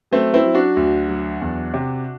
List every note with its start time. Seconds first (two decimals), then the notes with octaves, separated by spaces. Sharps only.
0.11 F#3 A3 C4
0.34 C4 E4
0.44 F#3
0.55 D4 F#4
0.77 D2
1.09 F#3
1.41 E2
1.74 C3